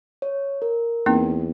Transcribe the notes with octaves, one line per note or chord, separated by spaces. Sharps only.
C#5
A#4
E2 A#3 C4 D#4